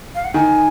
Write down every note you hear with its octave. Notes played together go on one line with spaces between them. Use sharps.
F5
F#5
D#3 G#5